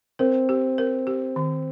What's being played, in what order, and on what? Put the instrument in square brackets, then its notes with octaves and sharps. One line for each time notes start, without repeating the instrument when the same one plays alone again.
[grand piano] C4 [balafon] A#4
[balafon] G4
A#4
G4
D#3